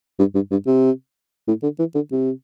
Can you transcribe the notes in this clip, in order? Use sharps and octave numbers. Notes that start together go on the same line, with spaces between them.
G2
G2
G2
C3
A2
D3
E3
D3
C3